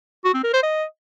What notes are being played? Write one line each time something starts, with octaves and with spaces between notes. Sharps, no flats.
F#4
C4
A#4
C5
D#5